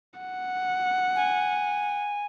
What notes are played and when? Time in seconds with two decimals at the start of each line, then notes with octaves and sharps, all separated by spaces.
0.20 F#5
1.15 G#5